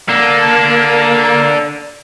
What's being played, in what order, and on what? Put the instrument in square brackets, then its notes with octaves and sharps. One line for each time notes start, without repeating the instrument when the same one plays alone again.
[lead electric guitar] A#3 [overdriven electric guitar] D4 A4